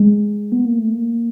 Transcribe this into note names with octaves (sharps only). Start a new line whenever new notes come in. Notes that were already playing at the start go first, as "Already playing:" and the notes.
Already playing: G#3
B3
A#3
A3
A#3